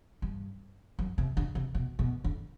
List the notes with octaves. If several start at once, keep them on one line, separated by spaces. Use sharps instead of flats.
G2
F#2
C3
D3
C3
B2
B2
D3